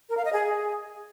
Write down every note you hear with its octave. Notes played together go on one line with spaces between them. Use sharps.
A#4
F5
D#5
G#4